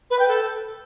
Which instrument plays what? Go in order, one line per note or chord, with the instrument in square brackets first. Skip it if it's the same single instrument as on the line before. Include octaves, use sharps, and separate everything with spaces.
[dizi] B4
G5
A4